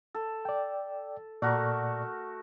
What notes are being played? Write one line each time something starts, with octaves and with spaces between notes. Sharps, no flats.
A4
D5 G5
A#2 A3 F#4 A#4 D5